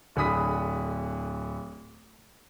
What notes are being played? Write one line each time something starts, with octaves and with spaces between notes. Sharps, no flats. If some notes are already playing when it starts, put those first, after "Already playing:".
D1 D3 G#4 B5 D#6 B6